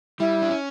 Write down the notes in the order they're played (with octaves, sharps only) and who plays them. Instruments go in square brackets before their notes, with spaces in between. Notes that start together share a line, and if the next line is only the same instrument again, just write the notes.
[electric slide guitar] G3 [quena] E4
[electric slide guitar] D4
C#4